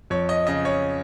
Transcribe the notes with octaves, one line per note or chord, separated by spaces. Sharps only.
F2 C#5
D#5
C#3 D#5
C#5